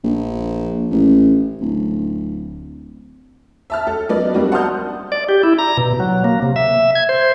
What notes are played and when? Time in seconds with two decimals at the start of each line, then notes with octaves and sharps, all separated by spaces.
0.04 A#1
0.91 A1
1.61 D1
3.70 E5 A5 F6
3.87 A4
4.09 F3 F#3 B3 D#4 D5
4.34 G3 A#3 C4 D4 F#4
4.52 F#5 A5 C6 D#6 F6 G6
5.12 D5
5.29 G4
5.43 E4
5.59 A#5
5.77 B2
6.00 F#3
6.24 A#3
6.42 C3
6.56 E5
6.95 G#6
7.09 C5